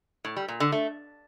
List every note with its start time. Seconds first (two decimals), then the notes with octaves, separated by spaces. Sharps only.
0.25 A2
0.37 G3
0.48 A#2
0.60 D3
0.72 A3